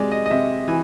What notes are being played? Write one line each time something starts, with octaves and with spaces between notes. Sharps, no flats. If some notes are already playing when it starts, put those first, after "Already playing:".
Already playing: C3 G#3 D5
D#5
D#5
C3 E5
E3 G#5